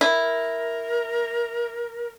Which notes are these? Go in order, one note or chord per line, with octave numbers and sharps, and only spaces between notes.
E4 A#4